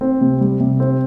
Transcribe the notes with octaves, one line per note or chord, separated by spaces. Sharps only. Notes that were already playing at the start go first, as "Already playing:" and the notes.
C4
C3
G3
C3
C4